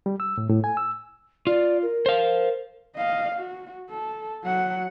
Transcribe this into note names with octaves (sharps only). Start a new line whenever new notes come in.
G3
E6
A2
A2
G#5
E6
F4 D5
A#4
C5 F5
D#5 F5
F#4
A4
F#3 F#5